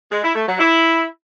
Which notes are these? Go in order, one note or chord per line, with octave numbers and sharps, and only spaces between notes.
G#3
E4
A3
F#3
E4